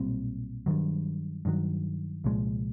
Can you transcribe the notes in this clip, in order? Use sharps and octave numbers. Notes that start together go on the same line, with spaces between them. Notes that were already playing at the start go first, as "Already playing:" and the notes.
Already playing: B1 A#2 G3 C4
G2 D#3 F#3
G2 D#3 F#3
C2 A#2 F3 G#3